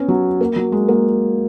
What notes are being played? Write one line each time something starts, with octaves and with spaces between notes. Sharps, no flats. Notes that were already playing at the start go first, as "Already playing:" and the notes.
Already playing: B3 C#4
F#3
A#3
F#3
G#3
A#3